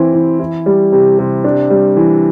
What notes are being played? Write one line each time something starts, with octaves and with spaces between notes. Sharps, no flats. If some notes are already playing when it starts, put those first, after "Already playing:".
Already playing: E3 C4 E4
E3
E4
G3
C3
C3
D4
G3
E3